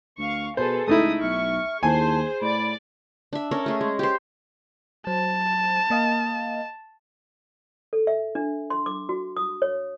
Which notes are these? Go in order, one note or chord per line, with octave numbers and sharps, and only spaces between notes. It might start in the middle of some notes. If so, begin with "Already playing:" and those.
D2 F5 C#6
B2 G#4 A4 B4 C5
C#2 A3 D#4 E4 D#6
B1 E5 C#6 F6
D#2 E4 G#4 C5 G#5 A5
A2 D5 B5 D6
D4 E5
C#4 A4 A#4
A3 G#4 D#5
G#3
G4 C5
F#3 C5 A5
A#3 D#5 F5
A4
E5
D4
C6
D6
F#4
D#6
C#5